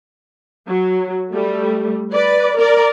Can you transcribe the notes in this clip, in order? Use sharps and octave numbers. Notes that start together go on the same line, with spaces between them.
F#3
G3 A3
B4 D5
A#4 D5